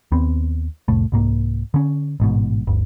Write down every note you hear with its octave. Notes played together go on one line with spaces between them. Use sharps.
D#2 B3 C4
C2 F2 A2 A3
C2 G#2 A#3
D3 C#4
A1 G#2 B2
G1 D2